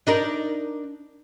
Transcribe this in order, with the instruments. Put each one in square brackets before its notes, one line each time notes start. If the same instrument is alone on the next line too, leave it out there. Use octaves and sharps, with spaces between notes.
[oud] D4 D#4 A#4